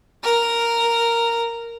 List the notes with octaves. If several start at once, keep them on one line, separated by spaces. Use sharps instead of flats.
A#4